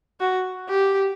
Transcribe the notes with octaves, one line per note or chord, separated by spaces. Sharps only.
F#4
G4